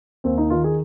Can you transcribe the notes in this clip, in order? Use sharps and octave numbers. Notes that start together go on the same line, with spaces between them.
D#2 C4
D#4
D#3 F4
G#4